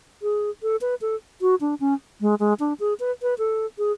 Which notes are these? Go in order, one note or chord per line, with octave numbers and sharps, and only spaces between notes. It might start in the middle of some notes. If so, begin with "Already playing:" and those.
G#4
A4
B4
A4
F#4
D4
C#4
G#3
G#3
D4
G#4
B4
B4
A4
G#4